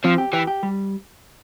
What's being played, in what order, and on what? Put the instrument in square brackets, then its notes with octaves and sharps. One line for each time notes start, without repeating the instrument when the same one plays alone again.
[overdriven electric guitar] F3 [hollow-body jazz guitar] C4
[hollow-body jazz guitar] G4
[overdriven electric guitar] E3 [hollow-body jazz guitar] G4
[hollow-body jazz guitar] G4
G3